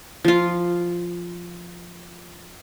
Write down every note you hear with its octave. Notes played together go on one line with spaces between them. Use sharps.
F3 F4